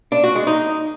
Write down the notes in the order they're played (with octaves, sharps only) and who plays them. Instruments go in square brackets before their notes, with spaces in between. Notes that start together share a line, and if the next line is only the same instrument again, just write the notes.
[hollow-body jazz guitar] D4
F#4
G#3
D#4